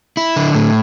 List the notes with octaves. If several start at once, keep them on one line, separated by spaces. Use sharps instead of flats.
E4
D3
A2